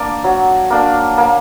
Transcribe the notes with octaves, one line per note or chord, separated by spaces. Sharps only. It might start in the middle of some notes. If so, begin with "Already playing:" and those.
Already playing: A#3 D4 D5
F#3
A#3 D4
A#3